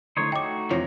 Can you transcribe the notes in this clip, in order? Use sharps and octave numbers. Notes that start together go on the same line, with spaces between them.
D3 A3 D#4 E4 C5 C#5
A3 D#4 F#4 C#5 D#5 G5 A#5 D6
F1 C3 E3 F3 C#5 A#6